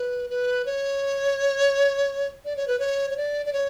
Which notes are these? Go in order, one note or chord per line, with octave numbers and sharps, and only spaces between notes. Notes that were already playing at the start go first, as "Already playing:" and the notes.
Already playing: B4
B4
C#5
D5
C#5
B4
C#5
C#5
D5
D5
C#5